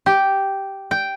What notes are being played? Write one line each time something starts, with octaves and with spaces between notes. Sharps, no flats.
G4
G5